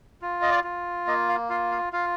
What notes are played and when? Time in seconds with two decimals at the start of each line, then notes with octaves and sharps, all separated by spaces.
0.22 F4
0.42 D#5
0.50 D5
0.64 F4
1.07 A#3 D#5
1.29 F5
1.50 F4 F5
1.72 F5
1.93 F4 F5